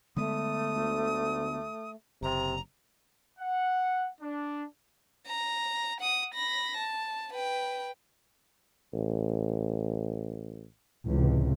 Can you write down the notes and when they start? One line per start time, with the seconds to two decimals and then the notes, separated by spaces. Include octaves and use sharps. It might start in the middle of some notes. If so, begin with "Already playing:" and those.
0.17 D3 G#3 A3 B3 D#6
0.74 D2
2.23 F#1 C3 A#5
3.39 F#5
4.21 D4
5.26 A#5
6.00 F#5 D#6
6.34 B5 A#6
6.77 A5
7.33 B4 G5
8.93 A1
11.07 C#2 A2 C3 E3